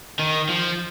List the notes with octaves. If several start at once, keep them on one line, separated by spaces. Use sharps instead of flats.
D#3
F3